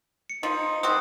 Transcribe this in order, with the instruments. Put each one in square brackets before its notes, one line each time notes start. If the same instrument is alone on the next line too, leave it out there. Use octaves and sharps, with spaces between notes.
[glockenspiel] C#7
[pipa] F3 [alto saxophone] D#4
[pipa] G3 C4 F#4 [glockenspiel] D#6